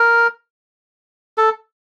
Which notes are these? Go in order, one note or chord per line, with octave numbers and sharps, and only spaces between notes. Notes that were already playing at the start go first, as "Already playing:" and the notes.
Already playing: A#4
A4